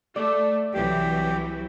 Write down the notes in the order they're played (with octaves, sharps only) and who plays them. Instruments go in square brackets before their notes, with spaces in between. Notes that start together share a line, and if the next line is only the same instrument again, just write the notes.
[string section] A3 [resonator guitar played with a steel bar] D5
[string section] C2 E3 F#3 [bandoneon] G4